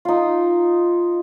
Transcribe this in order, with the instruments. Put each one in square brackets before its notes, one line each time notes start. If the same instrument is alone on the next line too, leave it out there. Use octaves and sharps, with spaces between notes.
[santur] D#4 F4